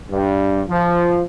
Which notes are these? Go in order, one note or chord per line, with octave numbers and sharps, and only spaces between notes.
G2
F3